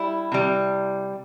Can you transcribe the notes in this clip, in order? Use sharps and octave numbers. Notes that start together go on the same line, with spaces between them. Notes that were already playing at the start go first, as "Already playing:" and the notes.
Already playing: G3 E4
C3 G3